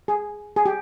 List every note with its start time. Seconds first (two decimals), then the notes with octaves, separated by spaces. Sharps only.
0.08 G#4
0.56 G#4
0.66 G4